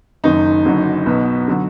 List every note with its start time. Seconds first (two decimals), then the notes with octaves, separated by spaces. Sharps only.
0.24 F#1 F#2 D#3 D#4
0.65 F#1 F#2 D3 F#3
1.06 B1 B2 F#3
1.48 D3 F#3